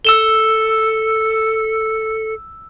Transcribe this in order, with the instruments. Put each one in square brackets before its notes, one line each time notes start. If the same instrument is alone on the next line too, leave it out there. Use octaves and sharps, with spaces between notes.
[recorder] A4 [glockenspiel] E6 E7 G7